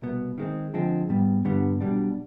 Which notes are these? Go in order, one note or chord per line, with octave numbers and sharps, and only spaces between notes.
C2 B2 B3
D#3 G#3 C4
D3 F3 G#3 C4
G#2 G3 B3
G2 D3 G3 B3
B1 B2 G3 D4